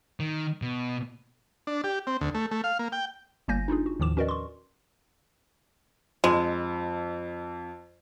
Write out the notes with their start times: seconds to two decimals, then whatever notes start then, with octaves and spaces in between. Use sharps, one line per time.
0.20 D#3
0.62 B2
1.67 D4
1.84 G4
2.07 C4
2.21 D2
2.35 A3
2.51 A3
2.64 F5
2.79 A#3
2.92 G5
3.48 G1 G3 A#3 G#5 G6 A#6
3.68 D4 D#4 F4 G#4
3.86 F#4
4.00 D#2 A2 D#3 F3 D6 E7
4.17 C#4 F#4 A#4 B4 D5 D#5
4.28 C6 C#6
6.24 F2 G#3